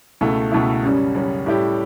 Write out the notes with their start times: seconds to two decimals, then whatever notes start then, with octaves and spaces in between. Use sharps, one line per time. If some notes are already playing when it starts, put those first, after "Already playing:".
0.21 C#2 B2 A3 E4
0.52 C#2 B2 A3 E4
0.84 F#2 C#3 G3 C#4
1.15 F#2 C#3 G3 C#4
1.46 A2 G3 C#4 E4 G4